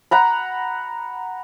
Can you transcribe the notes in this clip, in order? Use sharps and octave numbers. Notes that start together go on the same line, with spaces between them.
F#5 A#5 B5